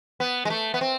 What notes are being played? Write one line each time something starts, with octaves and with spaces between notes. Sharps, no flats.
B3
G#3
A3
B3
C4